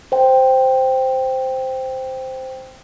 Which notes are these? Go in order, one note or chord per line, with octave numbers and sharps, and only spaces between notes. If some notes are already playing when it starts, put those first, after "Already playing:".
C5 G5